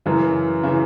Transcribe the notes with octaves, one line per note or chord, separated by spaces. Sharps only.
F#2 C#3 E3
C#3 E3